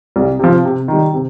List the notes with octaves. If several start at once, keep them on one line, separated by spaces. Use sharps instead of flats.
C2
C3 F3
C3
D#3 G3
C3